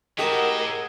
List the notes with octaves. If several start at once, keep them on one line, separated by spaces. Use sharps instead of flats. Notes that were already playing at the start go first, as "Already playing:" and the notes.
A2 G#3 F#4 G4 A4 A#4 D#5